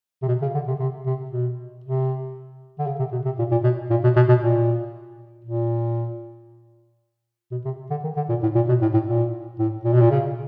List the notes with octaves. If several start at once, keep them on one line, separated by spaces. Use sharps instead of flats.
C3
B2
C#3
D3
C3
C3
C3
B2
C3
D3
C#3
C3
B2
C3
A#2
A#2
B2
A#2
B2
B2
B2
A#2
A#2
B2
C3
D3
D#3
D3
A#2
A2
A#2
B2
A2
A2
A#2
A2
A#2
B2
A#2
C#3